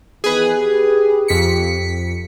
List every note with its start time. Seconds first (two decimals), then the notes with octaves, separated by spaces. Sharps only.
0.24 D#3 E3 B3 G#4 B4
0.57 G4
1.28 F2 B6 C#7